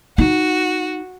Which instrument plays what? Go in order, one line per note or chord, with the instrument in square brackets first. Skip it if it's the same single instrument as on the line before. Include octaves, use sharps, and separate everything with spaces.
[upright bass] D#4 [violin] F#4